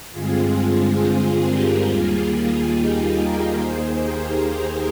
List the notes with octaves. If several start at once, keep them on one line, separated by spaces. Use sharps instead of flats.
G2 D3 G#3 C4 F4 G#4
G#4 C5
G4 A#4
D#2 D#3 G3 A#3 F4 G#4
F4 G#4
D#4 G4
G4 A#4
D#2 D#3 A#3 G#4 C5
G4 A#4
G#4 C5